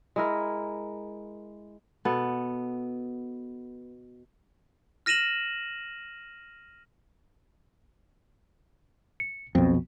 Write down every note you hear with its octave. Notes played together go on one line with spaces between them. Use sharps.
G#3 E4 A#4
B2 B3 A4
F6 A#6 D#7 E7 F#7
C#7
B1 F2 B2 C4